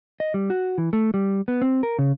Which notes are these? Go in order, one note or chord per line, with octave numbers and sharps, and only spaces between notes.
D#5
G3
F#4
E3
A3
G3
B3
C4
A#4
C#3